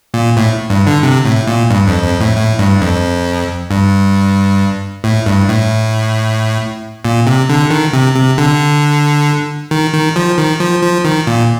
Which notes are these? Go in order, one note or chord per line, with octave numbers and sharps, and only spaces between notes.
A#2
A2
G2
D3
C3
A2
A#2
G2
F2
F2
A2
A2
G2
F2
G2
A2
G2
A2
A#2
C3
D3
D#3
C3
C3
D3
D#3
D#3
F3
D#3
F3
F3
D#3
A#2